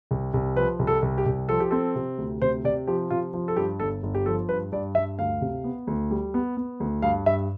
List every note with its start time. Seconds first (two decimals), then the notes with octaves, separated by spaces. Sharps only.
0.11 C2
0.34 C2
0.56 F3 B4
0.79 C2
0.87 A4
1.02 C2
1.18 G4
1.26 C2
1.49 F3 A4
1.60 G4
1.71 C4 A4
1.95 C3
2.18 D2
2.42 C3 C5
2.64 C3 D5
2.87 F3 G4
3.10 C3 F4
3.34 F3
3.48 A4
3.57 G2 G4
3.80 G1 A4
4.03 G1
4.15 G4
4.26 F3 A4
4.49 G2 B4
4.72 G2 D5
4.95 G2 E5
5.19 D2 F5
5.41 C3
5.64 B3
5.87 D2
6.11 G3
6.34 B3
6.57 B3
6.80 D2
7.02 G2 F5
7.26 G2 E5